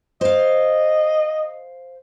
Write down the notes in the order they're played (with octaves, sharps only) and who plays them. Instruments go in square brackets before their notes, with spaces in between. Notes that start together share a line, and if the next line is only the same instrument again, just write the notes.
[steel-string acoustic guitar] C5 F5 [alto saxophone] D#5